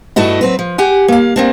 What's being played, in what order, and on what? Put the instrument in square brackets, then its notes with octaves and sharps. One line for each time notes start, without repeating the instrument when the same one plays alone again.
[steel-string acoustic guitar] G2 A3 E4 F#4 D#5
F#3 C4 B4
F3
G4 F#5 G#5
A#3 F5
A#3 C4 D4